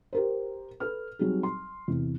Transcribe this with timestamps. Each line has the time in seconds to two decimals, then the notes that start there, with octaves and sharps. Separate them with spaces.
0.13 G4 A#4 C5
0.80 A4 B4 F6
1.19 F#3 G3 C4 D#4 G#4
1.43 C6
1.88 E2 C3